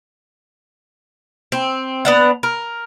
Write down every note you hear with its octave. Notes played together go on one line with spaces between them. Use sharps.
C4
B3 D4 F#5
A#4